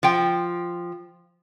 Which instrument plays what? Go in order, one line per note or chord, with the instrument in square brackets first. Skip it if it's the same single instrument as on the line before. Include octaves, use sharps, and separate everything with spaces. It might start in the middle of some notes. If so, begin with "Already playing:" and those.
[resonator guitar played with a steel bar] F3 G5